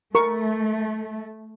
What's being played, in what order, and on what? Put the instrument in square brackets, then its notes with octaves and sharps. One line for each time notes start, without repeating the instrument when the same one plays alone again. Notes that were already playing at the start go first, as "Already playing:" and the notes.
[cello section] A3 [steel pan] A#4 C#6